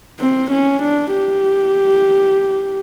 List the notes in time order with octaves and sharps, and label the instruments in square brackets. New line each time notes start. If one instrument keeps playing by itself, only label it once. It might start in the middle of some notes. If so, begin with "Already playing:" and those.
[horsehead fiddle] C4
C#4
D4
G4